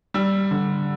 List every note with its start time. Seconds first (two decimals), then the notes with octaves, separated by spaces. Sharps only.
0.14 G3 E6
0.51 D3